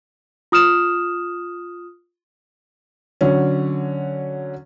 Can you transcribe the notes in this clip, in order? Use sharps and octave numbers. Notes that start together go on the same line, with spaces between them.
F4 D#6 F6 E7
D3 F#3 C#4